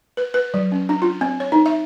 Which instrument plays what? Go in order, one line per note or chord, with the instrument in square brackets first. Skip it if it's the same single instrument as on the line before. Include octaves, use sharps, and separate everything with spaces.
[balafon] B4
B4
F#3
C#4
D4
F4
C4
C#5
D#4
E5